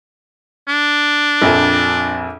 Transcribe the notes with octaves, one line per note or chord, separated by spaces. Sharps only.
D4
A#1 F2